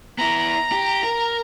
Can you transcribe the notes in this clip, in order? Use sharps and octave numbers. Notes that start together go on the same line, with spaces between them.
B3 E4 A#5
G4
A#4